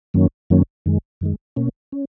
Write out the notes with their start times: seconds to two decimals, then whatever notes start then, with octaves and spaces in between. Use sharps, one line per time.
0.14 F#2 D#3 F#3 A#3 C#4
0.50 F#2 D#3 F#3 A#3 C#4
0.86 F#2 D#3 G#3
1.21 F#2 D#3 G#3
1.56 B2 A#3 C#4
1.92 C#4